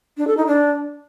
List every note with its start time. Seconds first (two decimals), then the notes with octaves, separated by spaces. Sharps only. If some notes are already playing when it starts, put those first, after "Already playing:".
0.17 D4
0.27 A4
0.37 D#4
0.47 D4